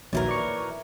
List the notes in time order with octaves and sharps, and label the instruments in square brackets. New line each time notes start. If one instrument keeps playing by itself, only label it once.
[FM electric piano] A#1 D#2 F#3 [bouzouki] A2 E3 A#4
[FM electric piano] D5 C#6